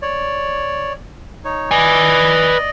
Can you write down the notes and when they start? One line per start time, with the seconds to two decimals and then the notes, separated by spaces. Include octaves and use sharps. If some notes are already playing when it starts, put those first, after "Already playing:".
0.02 C#5 D5
1.45 D#4 C#5
1.71 B4 D5 D#5 G#5